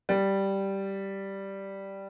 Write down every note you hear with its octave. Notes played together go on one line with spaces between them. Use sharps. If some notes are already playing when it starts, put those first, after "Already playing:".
G3